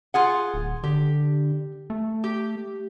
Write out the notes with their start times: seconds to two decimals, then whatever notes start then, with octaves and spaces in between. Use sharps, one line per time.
0.14 F4 G#4 F#5
0.54 D1
0.84 D3 G4
1.90 A3
2.24 G4